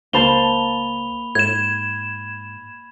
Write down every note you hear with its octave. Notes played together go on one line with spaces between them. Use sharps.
C#2 A#3 C5 A5 B5 F7 G7
G#2 G#6 E7